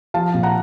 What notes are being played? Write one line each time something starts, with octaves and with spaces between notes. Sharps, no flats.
F3 F5 A5
A#1
F#5 A#5